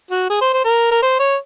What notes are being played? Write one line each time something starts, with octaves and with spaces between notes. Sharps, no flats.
F#4
G#4
C5
C5
A#4
A#4
C5
C#5